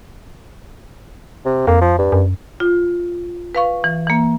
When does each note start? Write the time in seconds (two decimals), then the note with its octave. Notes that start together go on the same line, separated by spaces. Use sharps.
1.46 C3
1.67 F2 A#3
1.82 F3
1.99 G2
2.12 F#2
2.60 F4
3.55 B4 F5 C#6
3.84 E3
4.07 E3 A#3